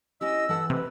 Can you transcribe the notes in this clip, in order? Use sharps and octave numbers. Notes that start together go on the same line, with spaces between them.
C#4 E4 G4 D#5 E6
E3 A4 D#5 F#5
C3 B4